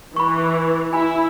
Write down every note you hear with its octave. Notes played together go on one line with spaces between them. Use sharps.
E3 B5 C#6
E4 G#5 B5